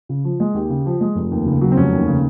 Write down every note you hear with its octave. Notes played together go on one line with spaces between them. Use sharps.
C#3
F3
G#3
D#2 G4
C#3
F3
G#3
F1
D#2
C#3
F#3
C4
F1 C#4
D#2
C#3